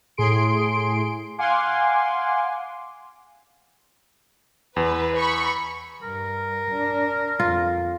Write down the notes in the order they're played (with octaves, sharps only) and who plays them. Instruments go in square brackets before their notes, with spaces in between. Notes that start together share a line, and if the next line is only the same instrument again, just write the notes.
[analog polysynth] A2 G#4 C6 D7
F5 F#5 G#5 C6 D6
[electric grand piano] E2 [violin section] B4
[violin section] B5 C#6
[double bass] G2 [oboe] A#4
[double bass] D4
[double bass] F2 [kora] F4